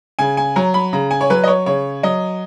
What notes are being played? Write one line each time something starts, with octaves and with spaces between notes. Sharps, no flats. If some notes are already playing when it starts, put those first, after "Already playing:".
C#3 G#5
G#5
F#3 A#5
B5
C#3 A#5
G#5
C#5
F#3 B4
D#5
C#5
C#3 C#5
F#3 D#5